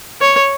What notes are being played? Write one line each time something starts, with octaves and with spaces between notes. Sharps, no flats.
C#5